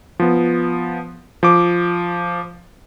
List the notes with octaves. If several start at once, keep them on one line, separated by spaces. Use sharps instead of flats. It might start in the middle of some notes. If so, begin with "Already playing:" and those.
F3 B3
F3 D6